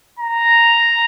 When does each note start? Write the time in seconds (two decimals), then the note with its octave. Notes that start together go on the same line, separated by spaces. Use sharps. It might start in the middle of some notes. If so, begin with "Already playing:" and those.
0.19 A#5